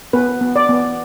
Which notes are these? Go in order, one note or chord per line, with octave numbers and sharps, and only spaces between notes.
B3 B4
B3
D5
B3